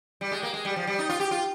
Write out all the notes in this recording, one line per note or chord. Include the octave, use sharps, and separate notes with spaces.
G3
G#3
A#3
G#3
G3
F3
G3
D#4
F4
G4
F4